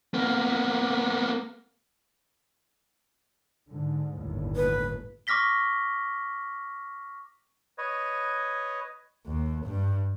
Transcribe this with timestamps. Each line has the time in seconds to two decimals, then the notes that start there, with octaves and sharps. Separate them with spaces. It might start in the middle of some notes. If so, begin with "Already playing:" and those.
0.14 A#3 B3
3.68 G#2 D3
4.17 G1 D#2 A2
4.56 B4
5.27 C#6 D6 F6 A#6 B6 G7
7.78 B4 C#5 D#5
9.27 D#2
9.66 G2